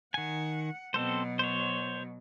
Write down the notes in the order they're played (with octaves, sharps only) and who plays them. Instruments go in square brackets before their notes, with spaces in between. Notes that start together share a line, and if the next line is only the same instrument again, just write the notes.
[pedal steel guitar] D#3 G#5 [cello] F#5
[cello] B2 F#3 [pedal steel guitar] C4 A4 C5
[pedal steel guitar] C5 C#5